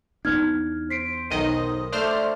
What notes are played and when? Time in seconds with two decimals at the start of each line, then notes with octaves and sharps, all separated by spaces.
0.25 E2 B3 D4 D#4 F6 G#6
0.90 C5 B6 C7 D7
1.31 B1 D#3 D#5 D#7
1.92 A3 D4 C5 F6